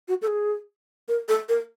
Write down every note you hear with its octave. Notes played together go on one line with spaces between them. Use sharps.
F#4
A4
G#4
A#4
A4
A#4